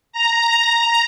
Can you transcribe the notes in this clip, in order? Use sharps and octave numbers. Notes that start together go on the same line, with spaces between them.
A#5